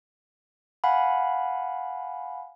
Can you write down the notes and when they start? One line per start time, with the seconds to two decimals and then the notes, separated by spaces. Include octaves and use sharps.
0.84 F5 F#5 G#5 B5